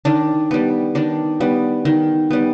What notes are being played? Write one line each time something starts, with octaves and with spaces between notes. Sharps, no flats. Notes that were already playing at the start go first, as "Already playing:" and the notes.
D#3 D4
G3 B3
D#3 D4
G3 B3
D#3
G3 B3